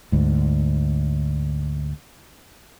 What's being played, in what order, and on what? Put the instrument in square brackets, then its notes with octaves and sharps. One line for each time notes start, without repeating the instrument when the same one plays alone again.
[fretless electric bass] D2 G#2